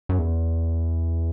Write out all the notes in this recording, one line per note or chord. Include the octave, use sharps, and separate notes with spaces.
F#2
E2